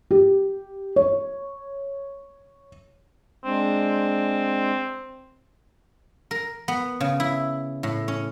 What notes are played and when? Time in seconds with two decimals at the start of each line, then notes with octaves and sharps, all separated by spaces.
0.11 G4
0.96 C#5
3.44 G#3 C4 D4
6.31 A#4
6.68 B3
7.00 C#3
7.20 E4
7.83 A2
8.08 C#4